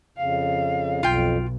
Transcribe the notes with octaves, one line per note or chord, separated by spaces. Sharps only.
F2 C#3 F5
B1 F2 F4 G5